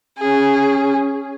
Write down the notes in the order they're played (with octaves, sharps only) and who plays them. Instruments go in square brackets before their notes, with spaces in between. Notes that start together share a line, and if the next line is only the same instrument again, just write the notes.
[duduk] C#4 [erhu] G#4